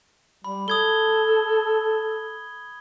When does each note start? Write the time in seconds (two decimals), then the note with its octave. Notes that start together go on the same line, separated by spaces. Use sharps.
0.44 G3 B5
0.68 A4 D#6 G#6 G7